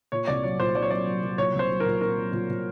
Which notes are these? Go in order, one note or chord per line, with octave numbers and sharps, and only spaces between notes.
A#2 C#5
C2 D5
F#3 C#5
A#2 C5
F#3 D5
C#5
F#3 D5
F#3
F#3
A#2 C#5
C2
C5
F#3
A#4
A#2
A#2 A#4
F#3
A#2
A#2